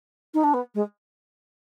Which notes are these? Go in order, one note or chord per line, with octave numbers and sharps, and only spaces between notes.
D#4
D4
B3
G#3